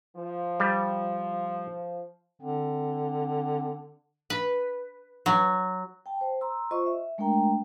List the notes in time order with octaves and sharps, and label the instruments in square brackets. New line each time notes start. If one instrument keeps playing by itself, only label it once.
[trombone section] F3
[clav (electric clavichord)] G3
[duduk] D3 [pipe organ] C4
[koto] B4
F#3
[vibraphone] G5 A5
C5
A#5 C6 E6
F4 C5 D#5 C#6
E5
G#3 A3 D4 A#4 G5 A#5